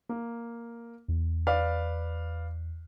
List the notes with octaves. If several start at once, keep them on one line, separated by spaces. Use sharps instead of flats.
A#3
E2
B4 D5 F5